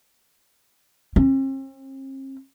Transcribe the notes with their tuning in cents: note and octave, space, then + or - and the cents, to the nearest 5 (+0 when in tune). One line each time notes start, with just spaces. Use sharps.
C4 +45